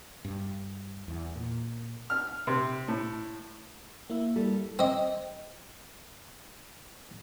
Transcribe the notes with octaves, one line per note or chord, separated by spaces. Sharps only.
G2
E2
A#2
F6
C3
A2
A#3 E4 E5
G3 A4
C4 D#5